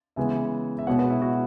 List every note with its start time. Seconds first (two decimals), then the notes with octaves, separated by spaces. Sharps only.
0.16 C#3 E3 G#3 B3 E5 G#5
0.79 E5
0.87 B2 G#3 B3 C#5 F#5
0.99 F#4 B4
1.10 E4
1.22 F#4